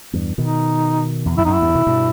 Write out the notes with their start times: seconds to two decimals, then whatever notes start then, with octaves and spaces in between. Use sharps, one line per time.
0.13 E2 G2
0.38 B2 D#3 D#4
1.26 E2
1.38 F#2 E4
1.45 E2 D#4
1.49 F#2 E4
1.62 E2 G2
1.75 B2 D#3
1.87 G2 B2